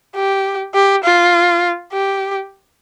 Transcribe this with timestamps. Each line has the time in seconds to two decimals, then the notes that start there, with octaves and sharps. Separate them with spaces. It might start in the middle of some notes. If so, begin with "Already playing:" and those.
0.16 G4
0.75 G4
1.04 F4
1.93 G4